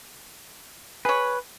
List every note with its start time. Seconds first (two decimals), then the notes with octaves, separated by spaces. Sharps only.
1.05 G#4 B4 C#5